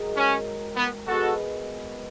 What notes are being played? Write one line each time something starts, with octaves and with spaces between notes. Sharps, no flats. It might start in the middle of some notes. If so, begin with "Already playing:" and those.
Already playing: G#2 D#3 F#3
C#4
B3
B2 G#3 B3 F#4 A4